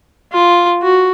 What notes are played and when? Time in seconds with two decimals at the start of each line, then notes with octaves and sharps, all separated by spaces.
0.33 F4
0.82 F#4